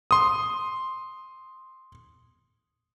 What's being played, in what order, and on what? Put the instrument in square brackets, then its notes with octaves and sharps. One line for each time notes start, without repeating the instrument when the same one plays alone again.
[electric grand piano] C6 D#6